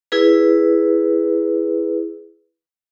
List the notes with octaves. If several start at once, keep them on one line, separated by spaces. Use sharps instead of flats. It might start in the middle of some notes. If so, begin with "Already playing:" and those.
E4 G#4 B4